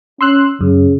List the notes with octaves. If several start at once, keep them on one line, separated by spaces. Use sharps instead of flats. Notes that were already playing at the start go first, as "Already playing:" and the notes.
C#4 C6 E6 F#6
F#2 C#3